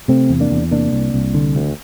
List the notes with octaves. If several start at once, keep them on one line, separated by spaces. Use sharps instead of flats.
C3 A3 C4
E2
A#3 D4
E2
C3 A#3 D4
C2
C2
D3
D2